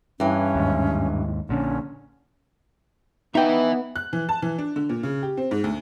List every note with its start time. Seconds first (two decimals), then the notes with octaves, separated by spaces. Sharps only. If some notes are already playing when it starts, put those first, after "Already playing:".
0.20 G2 E3 C#4
0.55 D#2 G#2
1.49 A#1 A#2 D3 C#4
3.35 B3 D#4 B4 E5 G5
3.96 F#6
4.13 E3
4.29 A5
4.42 E3
4.58 D4
4.76 D3
4.89 A#2
5.03 C#3
5.23 G4
5.37 C4
5.51 G#2
5.64 D2